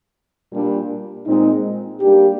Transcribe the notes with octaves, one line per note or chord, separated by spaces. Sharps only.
A#2 G3 D4
A#2 G#3 C4 D#4
G3 A#3 D4 G4